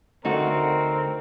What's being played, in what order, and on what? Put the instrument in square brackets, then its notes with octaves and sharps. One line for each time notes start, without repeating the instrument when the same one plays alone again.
[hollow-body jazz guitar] D2 A3 [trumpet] C4 [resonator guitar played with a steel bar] D#4 F#4 [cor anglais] A#4